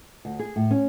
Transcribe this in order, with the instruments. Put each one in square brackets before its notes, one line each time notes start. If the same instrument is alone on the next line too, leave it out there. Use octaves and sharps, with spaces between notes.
[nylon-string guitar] D2
G#4
A2
C#4